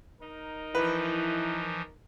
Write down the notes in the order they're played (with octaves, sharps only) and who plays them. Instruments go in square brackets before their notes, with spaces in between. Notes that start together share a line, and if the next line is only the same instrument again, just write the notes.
[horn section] D#4 A#4
[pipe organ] E3 F3 [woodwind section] E4 [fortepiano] B4